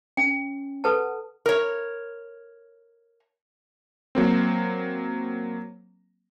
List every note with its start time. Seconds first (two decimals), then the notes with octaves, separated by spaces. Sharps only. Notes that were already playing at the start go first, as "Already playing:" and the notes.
0.17 C#4 G5
0.84 A4 B4 F#5 A5
1.46 A#4 C#5
4.15 F#3 A#3 C4